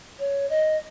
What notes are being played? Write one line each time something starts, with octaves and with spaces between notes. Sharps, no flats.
C#5
D#5